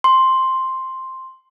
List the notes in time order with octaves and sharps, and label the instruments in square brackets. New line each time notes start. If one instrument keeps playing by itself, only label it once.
[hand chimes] C6